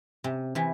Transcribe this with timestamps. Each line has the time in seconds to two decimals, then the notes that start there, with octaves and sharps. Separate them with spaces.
0.24 C3
0.55 C3 E3